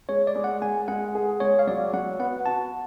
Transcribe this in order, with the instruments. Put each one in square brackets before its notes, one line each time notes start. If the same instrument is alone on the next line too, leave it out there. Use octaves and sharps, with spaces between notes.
[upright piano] G#3 [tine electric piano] C#5
[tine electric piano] D5
[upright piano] G#3
[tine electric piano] F#5
[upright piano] G#3 [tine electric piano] G#5
[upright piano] G#3 [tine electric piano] F#5
[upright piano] G#4
[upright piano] G#3 [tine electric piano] C#5
[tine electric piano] F5
[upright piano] F#3 [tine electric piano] D5
[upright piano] F#3 [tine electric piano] F#5
[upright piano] B3 [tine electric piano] F#5
[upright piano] F#4 [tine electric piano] A5